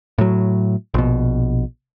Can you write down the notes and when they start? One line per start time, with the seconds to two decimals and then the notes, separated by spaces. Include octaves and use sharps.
0.18 A2 F#3
0.94 A#1 B2